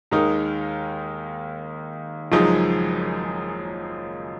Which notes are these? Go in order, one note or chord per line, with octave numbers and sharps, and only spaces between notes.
D#2 D#3 G#3 D#4 A#4
F#1 F#2 F3 G#3 D#4